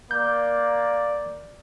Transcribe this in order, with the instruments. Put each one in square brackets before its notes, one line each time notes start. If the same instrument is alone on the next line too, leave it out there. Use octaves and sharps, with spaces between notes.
[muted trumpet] A#3 [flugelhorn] D5 [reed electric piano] G6